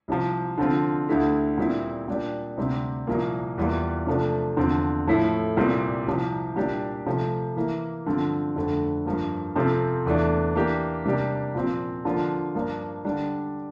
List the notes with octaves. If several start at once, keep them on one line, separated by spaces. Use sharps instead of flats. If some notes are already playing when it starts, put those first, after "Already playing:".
C2 C3 F3
D3 F3 C4 F4
D2 D3 A3 E4 G4
A#2 G3 C4 E4
A#2 G3 D4 G4
D2 C3 G3 C4
C2 A#2 F3 A#3
E2 E3 G3 A#3 F4
C3 F3 A3 D4
E2 D3 F3 C4
A2 F3 A3 E4 A4
C2 A#2 G3 C4 G4
C2 C3 F3
A#2 G3 D4 G4
C3 F3 A3
E3 A#3 E4
G2 D3 F3 C4 F4
F2 D3 A3
G2 F3 A#3
C3 F3 C4 F4 A4
E2 E3 A3 D4
E3 A#3 D4 G4
C3 G3 A#3 D4 G4
A#2 F3 C4
D3 F3 A#3 D4 F4
G2 F3 A#3 D4
D3 G3 D4